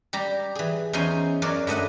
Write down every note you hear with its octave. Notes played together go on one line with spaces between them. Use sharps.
G3 G4 A#5
E3 G#4
E2 C#4 D#4 C5 G#5 C6
F#2 F#3 A#4 C#5 D5
G2 A3 D#5 F#5